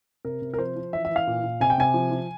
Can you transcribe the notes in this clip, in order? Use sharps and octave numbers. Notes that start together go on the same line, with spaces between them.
C3 A#4
C3
A#4
F3 C5
F3
E3 E5
E5
E3
F5
A#2
A#2
C3 G#5
G5
C3 G#5
F3
F3